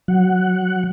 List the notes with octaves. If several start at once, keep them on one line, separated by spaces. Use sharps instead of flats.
F#3 F#5